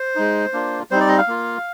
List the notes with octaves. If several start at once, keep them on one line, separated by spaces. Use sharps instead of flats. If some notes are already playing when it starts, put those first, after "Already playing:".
Already playing: C5
G#3 D#4
A#3 D4 F4
G3 C4 D#4 C5
D5
D#5
F5
A#3 F4